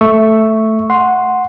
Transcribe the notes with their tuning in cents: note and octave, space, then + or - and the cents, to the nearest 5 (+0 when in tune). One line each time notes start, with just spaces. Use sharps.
A3 +0 E5 +0 C#6 +0
F#5 -10 C6 +0